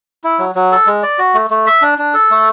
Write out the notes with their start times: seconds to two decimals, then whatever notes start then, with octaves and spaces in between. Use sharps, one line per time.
0.24 E4
0.39 F#3
0.55 F#3
0.72 A4
0.87 G#3
1.03 D5
1.19 F#4
1.34 A3
1.50 A3
1.66 E5
1.82 D4
1.98 D4
2.14 A4
2.31 A3